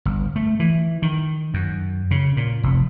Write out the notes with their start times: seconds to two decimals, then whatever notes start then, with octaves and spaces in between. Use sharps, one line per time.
0.05 G1
0.36 A3
0.60 E3
1.02 D#3
1.54 F#2
2.11 C#3
2.37 A#2
2.63 F1